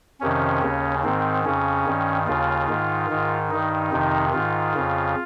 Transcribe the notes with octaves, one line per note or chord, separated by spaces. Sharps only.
F2 C3 D#3 C#4
D#2 C#3
G#2 D#3 C4
F2 C#3 C#4
G2 D#3
D#2 C#3 F4
G#2 D#3
G#2 D#3
G2 D#3 D#4
F2 C3 D#3
G#2 D#3 F4
F2 C#3